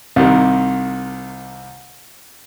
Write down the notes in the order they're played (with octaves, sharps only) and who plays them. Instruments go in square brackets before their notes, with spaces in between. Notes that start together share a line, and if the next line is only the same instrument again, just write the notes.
[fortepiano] C2 C3 D#3